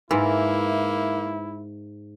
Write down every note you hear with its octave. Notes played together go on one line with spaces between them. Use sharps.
G#2 E3 A#3 E4 A#4